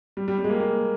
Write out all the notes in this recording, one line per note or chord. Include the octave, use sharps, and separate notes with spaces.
G3
G3
G3
G#3
A#3
A#3